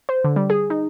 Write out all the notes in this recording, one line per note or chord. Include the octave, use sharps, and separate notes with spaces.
C5
D3
G3
G#4
D#4